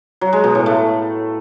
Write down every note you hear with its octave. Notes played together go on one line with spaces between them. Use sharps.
F#3
G#3
B2
A2
A3